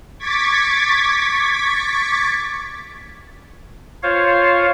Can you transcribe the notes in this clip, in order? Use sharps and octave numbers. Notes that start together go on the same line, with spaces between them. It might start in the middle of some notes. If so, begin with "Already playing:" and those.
C#6 D6 G#6 A6 B6
F4 C5 C#5 F5